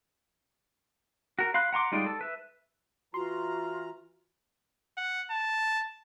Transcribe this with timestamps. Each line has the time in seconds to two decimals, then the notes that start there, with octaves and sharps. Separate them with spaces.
1.39 F#4 A#4
1.54 F5 B5 C6 F#6
1.73 F#5 A#5 C6 D6
1.92 G3 G#3 D#4 F4 D5
2.06 A4
2.21 B4 E5
3.14 E3 F4 F#4 A#5 C6
4.97 F#5
5.31 A5